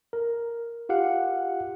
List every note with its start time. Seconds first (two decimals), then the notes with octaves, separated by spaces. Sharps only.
0.13 A#4
0.89 F4 G4 F5 F#5